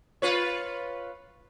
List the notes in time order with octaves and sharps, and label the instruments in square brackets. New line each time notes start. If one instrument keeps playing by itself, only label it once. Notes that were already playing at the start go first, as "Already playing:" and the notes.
[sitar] F4 B4 C#5